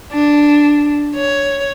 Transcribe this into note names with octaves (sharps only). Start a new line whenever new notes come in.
D4
C#5